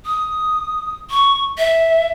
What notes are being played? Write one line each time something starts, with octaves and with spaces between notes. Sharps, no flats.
D#6
C#6
E5